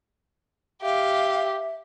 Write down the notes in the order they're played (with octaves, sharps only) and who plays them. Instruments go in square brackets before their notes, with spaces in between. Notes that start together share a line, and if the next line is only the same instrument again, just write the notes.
[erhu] G4 [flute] E5 [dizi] F5